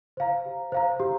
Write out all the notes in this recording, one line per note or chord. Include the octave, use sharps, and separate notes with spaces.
C5 F5 A#5
G4
C5 F5 A#5
G4